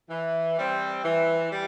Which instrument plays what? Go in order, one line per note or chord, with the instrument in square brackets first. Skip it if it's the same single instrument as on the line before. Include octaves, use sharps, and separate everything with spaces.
[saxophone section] E3
G3 C4
E3
G3